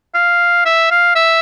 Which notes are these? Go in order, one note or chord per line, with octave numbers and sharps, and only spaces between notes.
F5
E5
F5
E5